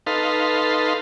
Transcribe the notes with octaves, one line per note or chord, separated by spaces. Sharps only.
D#4 A4 B4 F5 C6